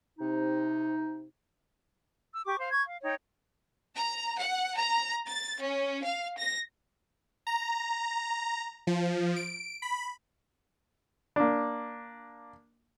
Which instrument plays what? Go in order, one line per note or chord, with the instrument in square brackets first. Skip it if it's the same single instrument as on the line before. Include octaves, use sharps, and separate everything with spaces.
[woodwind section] C3 D#4
[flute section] E6
G4 C#6 D6
C5 F5
C#6 G#6
F5
D#4 C#5 G5
[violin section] A#5
F#5
A#5
A6
C#4
F5
A#6
[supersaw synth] A#5
F3
D7
B5
[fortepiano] A#3 D4